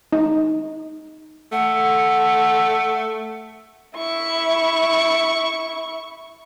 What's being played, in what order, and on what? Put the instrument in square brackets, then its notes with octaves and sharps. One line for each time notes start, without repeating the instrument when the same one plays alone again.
[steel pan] D#4
[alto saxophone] A3 [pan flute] F#5
[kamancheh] E4 C#6